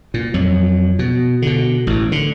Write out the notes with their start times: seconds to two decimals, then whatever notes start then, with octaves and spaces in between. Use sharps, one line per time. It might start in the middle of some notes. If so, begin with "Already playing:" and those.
0.14 A#2
0.34 F2 F#3
0.99 B2
1.42 B2 D3
1.87 A1 A2
2.12 D3